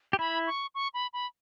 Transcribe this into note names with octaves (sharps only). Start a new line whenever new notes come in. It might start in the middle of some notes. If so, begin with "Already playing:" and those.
G4
E4 B5
C#6
C#6
B5
B5